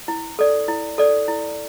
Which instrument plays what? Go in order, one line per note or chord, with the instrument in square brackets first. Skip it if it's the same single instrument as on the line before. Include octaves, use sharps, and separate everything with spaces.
[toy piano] E4
A4 D5
E4
A4 D5
E4